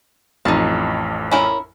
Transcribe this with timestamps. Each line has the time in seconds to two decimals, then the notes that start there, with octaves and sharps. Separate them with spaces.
0.45 A1 F2 D#4 A5
1.31 C#4 E4 A#4